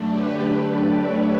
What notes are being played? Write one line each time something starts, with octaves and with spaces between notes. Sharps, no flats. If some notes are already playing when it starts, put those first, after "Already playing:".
Already playing: F#2 D3 A3 D4
G4 B4
B4 D5
C#5 E5